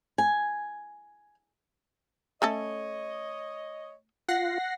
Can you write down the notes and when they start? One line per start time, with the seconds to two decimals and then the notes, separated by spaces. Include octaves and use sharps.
0.18 G#5
2.42 A3 C#4 A4 C#5 D#5
4.29 F4 F#5 A#6 C7